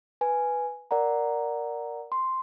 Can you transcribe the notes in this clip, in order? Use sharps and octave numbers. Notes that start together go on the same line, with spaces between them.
B4 G#5
A#4 D5 F#5 A#5
C6